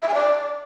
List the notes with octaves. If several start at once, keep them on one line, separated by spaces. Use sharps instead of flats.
E5
G#5
D5